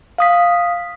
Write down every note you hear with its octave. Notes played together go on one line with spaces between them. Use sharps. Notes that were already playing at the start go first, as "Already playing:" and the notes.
F5 D#6 B6